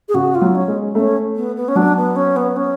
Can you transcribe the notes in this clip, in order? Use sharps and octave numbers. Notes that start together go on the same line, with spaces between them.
G#4
C#3 F#4
F4
F#3
C#4
G#3
A3 C#4
B3
B3
C#4
F#3 D4
B3
C#4
B3
C#4